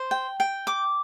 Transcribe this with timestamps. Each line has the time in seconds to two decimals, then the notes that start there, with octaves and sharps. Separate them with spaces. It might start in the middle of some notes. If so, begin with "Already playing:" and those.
Already playing: C5
0.11 G5
0.40 G5
0.67 D6